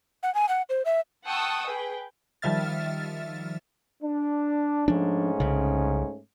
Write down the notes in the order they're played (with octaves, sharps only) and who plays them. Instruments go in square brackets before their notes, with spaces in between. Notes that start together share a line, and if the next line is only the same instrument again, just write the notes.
[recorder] F#5
G#5
F#5
C5
E5
[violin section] F#5 G5 A5 C#6 D#6 E6
G#4 B4 G5
[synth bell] D#3 F3 G3 E5 F6 A6
[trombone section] D4
[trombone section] G#2 A3 C#4 [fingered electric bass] F3 D4
[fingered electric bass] C2 C#3